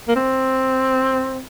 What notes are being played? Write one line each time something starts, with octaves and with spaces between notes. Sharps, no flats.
A#3
C4